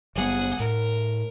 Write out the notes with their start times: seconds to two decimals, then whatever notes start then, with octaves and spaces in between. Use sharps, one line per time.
0.16 F#1 G3 B3 G#4 F#5
0.60 A2 A#4